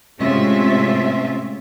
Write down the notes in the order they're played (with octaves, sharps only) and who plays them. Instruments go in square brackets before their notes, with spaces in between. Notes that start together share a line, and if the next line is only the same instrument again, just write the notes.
[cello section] A2 C3 G#3 C#4 F4 E5